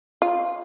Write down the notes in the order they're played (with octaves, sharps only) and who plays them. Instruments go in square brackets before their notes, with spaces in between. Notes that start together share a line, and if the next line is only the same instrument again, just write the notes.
[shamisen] F4